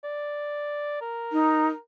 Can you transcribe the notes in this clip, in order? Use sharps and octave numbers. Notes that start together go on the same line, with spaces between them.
D5
A#4
D#4